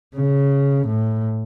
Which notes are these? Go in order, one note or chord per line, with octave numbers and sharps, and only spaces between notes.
C#3
A2